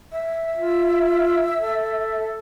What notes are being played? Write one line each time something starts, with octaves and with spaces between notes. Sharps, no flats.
E5
F4
A4